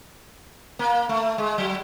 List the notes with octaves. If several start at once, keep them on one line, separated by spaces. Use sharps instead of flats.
A#3
A3
G#3
F#3